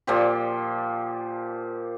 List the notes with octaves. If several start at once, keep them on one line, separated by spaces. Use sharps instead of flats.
A#2 F3 G4